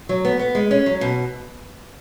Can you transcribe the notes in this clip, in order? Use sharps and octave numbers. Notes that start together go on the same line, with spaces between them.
F#3
B3
B3
G#3
C#4
F#3
B2